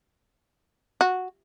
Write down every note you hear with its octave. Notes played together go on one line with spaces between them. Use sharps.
F#4